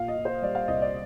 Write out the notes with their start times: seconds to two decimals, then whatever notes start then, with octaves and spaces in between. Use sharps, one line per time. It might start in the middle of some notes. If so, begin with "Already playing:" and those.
Already playing: A#2 F5
0.08 D#5
0.17 A#2
0.25 C5
0.42 G3 D5
0.55 F5
0.68 C2 D#5
0.82 D5